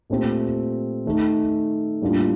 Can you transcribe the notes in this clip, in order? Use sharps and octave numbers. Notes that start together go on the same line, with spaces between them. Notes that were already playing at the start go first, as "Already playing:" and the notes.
A#2 A3 C4 G4
D#3 A3 D#4
A2 G3 A#3 D4 F4